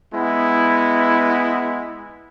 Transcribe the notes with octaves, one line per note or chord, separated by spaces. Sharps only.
G#3 B3 E4